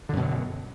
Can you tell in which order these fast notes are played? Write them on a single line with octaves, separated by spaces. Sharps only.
D3 F#2 B2 F#3